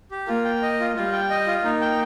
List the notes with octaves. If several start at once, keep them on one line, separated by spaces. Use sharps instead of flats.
G4
A#3 F4
G5
D#5
F4
G3 F4
G5
D#5
F4
A#3 D#4
G5